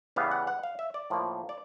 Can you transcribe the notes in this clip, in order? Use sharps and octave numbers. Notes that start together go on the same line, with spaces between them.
C#3 E3 G3 B3 F5
F#5
F#5
F5
E5
D5
A2 F3 A#3
D5